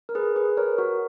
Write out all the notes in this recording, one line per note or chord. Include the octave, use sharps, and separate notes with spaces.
A#4
G#4 B4
G#4 B4
A#4 C#5
F#4 A#4